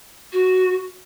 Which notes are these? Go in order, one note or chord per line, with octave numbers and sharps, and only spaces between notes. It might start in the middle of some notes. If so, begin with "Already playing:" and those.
F#4